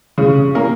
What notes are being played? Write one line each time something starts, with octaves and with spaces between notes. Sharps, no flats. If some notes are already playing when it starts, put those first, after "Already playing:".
C#3
A#3